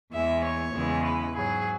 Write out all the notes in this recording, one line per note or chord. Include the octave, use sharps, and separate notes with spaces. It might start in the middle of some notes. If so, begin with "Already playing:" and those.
E2 E3 G#3 E5
C#5
E2 C#3 E3 G#3
B4
G#2 F#3 G#4